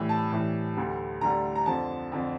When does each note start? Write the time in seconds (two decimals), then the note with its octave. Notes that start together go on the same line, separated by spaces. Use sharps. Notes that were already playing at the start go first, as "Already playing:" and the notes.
Already playing: A2 E3 G3
0.09 A5
0.32 A2 E3 G3
0.77 D2 D3 G3
1.21 D2 D3 G3 A#5
1.56 A#5
1.66 F2 D3 F3 A5
2.12 F2 D3 F3